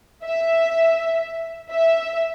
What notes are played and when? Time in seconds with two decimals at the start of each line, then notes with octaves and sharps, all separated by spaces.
0.23 E5
1.70 E5